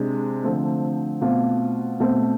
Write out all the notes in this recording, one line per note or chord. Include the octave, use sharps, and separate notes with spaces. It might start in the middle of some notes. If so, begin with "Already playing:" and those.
Already playing: C3 G#3 D4
D3 F3 A3 C4
B2 A3 C4 F4
B2 A3 C4